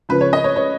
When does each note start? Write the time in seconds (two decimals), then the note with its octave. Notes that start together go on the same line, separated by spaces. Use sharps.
0.09 C#2 C#3 F3 B4
0.21 C#5
0.33 D#5
0.44 C#5
0.56 C#5